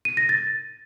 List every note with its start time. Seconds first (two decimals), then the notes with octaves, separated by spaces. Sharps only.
0.05 D#7
0.17 A#6
0.29 A6